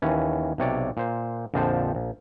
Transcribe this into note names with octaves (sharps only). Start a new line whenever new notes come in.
D#2 E3 C#4
B1 C3 C#5 D5
A#2 C5
A#1 F2 D3 F3 C5 A5
A#1